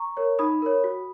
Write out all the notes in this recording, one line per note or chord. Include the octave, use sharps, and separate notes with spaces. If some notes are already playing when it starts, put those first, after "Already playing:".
Already playing: A#5 C#6
A#4 C#5
D#4 B5 D#6
A#4 C#5
F#4